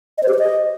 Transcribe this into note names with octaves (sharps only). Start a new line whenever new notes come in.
D#5
C5
G4
C5
D#5